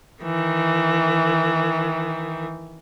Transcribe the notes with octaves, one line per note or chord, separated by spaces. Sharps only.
D#3 E3